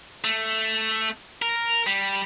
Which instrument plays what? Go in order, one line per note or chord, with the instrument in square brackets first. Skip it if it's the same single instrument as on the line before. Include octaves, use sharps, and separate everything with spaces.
[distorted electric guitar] A3
A#4
G3